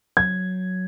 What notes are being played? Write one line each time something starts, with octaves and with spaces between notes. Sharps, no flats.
F#3 G#6